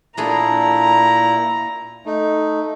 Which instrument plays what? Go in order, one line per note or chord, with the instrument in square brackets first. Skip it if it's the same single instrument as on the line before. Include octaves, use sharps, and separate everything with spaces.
[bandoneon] A#2 E4 [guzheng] D4 G#4 A4 [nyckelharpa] A#5
[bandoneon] A3 D#4